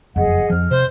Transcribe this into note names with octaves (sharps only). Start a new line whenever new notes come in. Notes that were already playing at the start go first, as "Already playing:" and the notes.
F#1 F2 G#4 D#5 F#5
F2 F3 F6
C3 C5